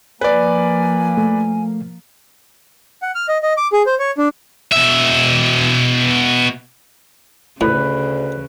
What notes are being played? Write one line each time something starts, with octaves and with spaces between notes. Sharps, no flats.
F3 A#3 B4 D5 G#5
A3
F#5
F6
D#5
D#5
D6
G#4
C5
C#5
D4
B2 E5
D2 A2 C#3 B4